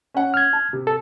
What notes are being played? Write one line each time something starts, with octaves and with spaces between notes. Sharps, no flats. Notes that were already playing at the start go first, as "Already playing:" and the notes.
C#4 F#5
F6 G#6
A5
C3
A4